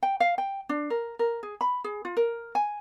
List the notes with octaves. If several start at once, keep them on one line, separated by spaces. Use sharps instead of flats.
G5
F5
G5
D4
A#4
A#4
G#4
B5
G#4
F4
A#4
G#5